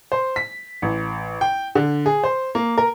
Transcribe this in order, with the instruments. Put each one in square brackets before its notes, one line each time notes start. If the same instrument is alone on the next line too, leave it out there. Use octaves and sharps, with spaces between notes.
[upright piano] C5
B6
A1
G5
D3
G#4
C5
A#3
A#4